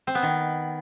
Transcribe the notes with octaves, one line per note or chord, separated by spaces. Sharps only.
C4
B3
D#3